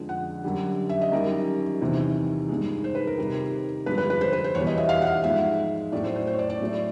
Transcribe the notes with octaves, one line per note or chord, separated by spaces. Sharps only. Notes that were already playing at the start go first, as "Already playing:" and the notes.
Already playing: F2 D3 F3 G#3
F#5
F#2 D3 G3
E5
D#5
F#2 D#3 G3 A#4
E2 C3 D#3
G2 D#3 G#3
C5
B4
A#4
C3 D#3 G3
G2 D3 F3 G#3 B4
B4
B4
C5
B4
C5
E2 B2 G3 C#5
D#5
E5
F5
F#5
F5
G#2 F3 G#3 E5
A2 F#3 A3 D5
C5
C5
C5
C#5
D5
D5
A2 F#3 A3